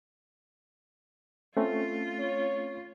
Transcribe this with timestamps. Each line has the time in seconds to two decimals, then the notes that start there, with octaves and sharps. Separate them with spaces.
1.57 A3 C4 C#4 F4
2.20 C#5